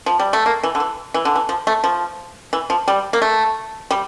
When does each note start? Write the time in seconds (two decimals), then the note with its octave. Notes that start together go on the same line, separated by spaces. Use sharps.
0.06 F3
0.19 G3
0.33 A3
0.46 A#3
0.63 E3
0.75 D3
0.80 E3
1.14 E3
1.25 D3
1.35 E3
1.49 F3
1.67 A3
1.84 F3
2.53 E3
2.70 F3
2.88 G3
3.13 A#3
3.22 A3
3.91 G3